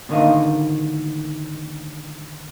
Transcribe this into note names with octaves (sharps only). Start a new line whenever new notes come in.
A2 D3 D#3 A#3 D#5 F5